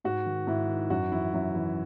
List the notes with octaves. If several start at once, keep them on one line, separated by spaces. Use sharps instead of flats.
G#2 F#4
D#3
G#2 E4
D#3
F#2 F#4
E3 E4
F#2 E4
E3